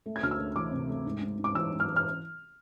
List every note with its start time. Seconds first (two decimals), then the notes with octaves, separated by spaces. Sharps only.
0.06 A3
0.16 G#6
0.23 D2 F6
0.31 E6
0.38 A3
0.56 E3 D6
0.72 C3
0.89 A3
1.06 G#2
1.22 G#2
1.38 G#2
1.44 D6
1.55 E3 E6
1.72 G#2
1.80 F6
1.88 E3
1.96 F6